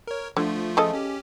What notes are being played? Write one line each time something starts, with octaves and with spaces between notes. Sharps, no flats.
A#4 C#5
D3 F3 A3 F4
C#3 A4 D#5
C#4 G4